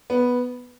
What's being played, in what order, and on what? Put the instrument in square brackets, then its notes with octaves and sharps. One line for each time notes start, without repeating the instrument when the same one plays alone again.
[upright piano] B3